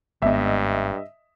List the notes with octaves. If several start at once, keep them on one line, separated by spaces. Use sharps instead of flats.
G#1 G2 B3 D#5 E5